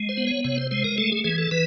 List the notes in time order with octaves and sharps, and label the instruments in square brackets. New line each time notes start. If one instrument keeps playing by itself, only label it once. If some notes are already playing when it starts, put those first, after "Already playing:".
Already playing: [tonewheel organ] G#3
C5
B3
C#5
C3 C#5
C5
G#3 C5
A#4
A3 A4
G#4
E3 G#4
A4
E3 B4